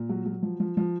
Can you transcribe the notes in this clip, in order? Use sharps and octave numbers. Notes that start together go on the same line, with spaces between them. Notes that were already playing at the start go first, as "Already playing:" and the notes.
Already playing: A#2
F#3
F#3
F3
F3
F3